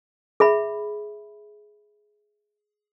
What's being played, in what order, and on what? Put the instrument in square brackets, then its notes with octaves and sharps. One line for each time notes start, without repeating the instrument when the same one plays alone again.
[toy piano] G#4 E5 B5